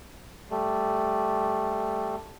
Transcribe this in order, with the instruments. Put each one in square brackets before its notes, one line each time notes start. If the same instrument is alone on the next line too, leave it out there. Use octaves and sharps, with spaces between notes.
[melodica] G3 A3